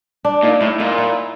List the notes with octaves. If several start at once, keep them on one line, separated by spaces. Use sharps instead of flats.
D4
A#2 D#4
A2 E4
A#2 D#4
E4